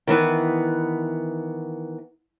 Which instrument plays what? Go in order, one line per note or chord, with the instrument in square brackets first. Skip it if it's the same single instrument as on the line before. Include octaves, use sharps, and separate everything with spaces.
[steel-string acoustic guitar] D#3 E3 B3